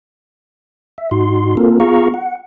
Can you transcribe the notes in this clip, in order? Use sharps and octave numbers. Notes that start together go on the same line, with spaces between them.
E5
G#2 D#4 F#4 C6
A#3 C4 F4 A4 A#4
B3 F4 G#4 F5 A#5 C#6
F#5